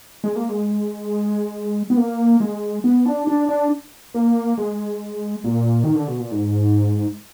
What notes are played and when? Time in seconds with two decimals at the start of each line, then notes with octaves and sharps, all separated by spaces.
0.24 G#3
0.36 A#3
0.49 G#3
1.90 B3
1.97 A#3
2.40 G#3
2.84 B3
3.06 D4
3.27 D4
3.49 D4
4.14 A#3
4.58 G#3
5.44 A#2
5.84 D#3
5.95 D3
6.08 B2
6.19 A#2
6.31 G#2